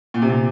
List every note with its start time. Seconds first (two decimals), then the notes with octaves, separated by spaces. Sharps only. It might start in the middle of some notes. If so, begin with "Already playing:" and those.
0.14 A#2
0.22 C3
0.29 A#2